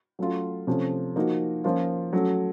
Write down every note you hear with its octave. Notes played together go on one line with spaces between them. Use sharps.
F#3 A3 C#4 F4
C3 F3 A3 C#4
F3 A#3 D#4 F#4
F3 A#3 C#4 F4
F#3 A3 C#4 F#4